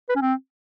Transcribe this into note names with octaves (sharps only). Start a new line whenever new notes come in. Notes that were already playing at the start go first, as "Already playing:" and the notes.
B4
C#4
C4